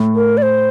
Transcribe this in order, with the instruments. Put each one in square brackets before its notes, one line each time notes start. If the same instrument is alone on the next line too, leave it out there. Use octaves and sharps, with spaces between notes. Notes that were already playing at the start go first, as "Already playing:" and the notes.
Already playing: [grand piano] A2
[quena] A#4
D5
C5